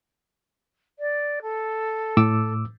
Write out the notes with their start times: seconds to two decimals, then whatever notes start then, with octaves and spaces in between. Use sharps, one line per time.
0.99 D5
1.42 A4
2.17 A2 D6 E6